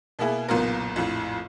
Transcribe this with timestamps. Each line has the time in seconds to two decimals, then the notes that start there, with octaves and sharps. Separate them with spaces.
0.19 B2 A#3 B3 E4 G#4
0.48 F#1 B1 A#2 B3 F4 A#4
0.96 A#1 F2 A2